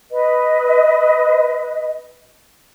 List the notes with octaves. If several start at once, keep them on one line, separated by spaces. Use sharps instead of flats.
B4 D#5